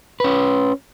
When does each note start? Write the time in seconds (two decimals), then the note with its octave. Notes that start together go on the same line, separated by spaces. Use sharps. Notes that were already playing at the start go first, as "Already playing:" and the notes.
0.20 C#4 B4